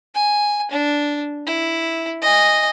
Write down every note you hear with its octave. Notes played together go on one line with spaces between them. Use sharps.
G#5
D4
E4
D#5 G#5